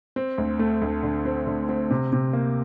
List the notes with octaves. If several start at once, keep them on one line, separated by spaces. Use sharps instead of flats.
C4
D2
A3
D2
D3
C4
D3
C4
C3
C3
A#3